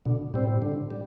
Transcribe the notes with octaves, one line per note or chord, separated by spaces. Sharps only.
B2 D3
A2 G3 C4
D3
G3